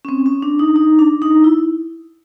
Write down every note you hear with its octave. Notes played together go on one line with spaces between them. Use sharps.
C#4
C4
C#4
D4
D#4
D#4
D4
D#4
E4